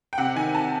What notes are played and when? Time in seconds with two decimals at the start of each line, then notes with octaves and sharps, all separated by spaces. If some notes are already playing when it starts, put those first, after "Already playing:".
0.13 G5
0.18 C3 F#5
0.36 D#3 G#5
0.55 A5